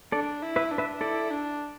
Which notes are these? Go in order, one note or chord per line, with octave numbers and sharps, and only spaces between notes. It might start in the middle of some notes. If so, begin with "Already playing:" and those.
D4 A4 D5
E4
B4 E5
D4
B4 E5
E4 A4 D5
D4